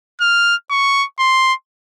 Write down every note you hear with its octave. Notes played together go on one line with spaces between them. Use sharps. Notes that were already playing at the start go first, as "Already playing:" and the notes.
F6
C#6
C6